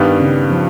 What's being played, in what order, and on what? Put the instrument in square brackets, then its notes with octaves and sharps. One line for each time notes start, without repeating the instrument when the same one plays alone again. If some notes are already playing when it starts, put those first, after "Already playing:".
Already playing: [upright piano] G2 D#3 G3 B3
[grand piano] C#3
F3